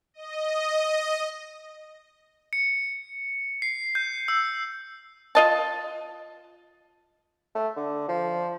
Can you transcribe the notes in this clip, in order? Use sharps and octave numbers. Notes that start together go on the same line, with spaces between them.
D#5
C#7
C7
G6
E6
F4 D#5 A5
A3
D3
F3